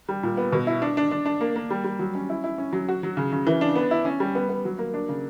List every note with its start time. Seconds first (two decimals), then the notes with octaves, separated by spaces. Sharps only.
0.09 G3
0.23 A#2
0.37 B3
0.52 B2
0.67 E4
0.82 D4
0.97 D4
1.11 D4
1.26 D4
1.41 A#3
1.56 A#3
1.70 G3
1.84 G3
1.99 F#3
2.15 C#4
2.30 E4
2.44 E4
2.58 C#4
2.73 F#3
2.88 F#4
3.03 F#3
3.17 C#3
3.32 C#3
3.47 E3
3.61 D4
3.76 B3
3.91 E4
4.05 C#4
4.20 G3
4.35 B3
4.49 B3
4.65 F#3
4.79 A#3
4.94 D4
5.09 C#3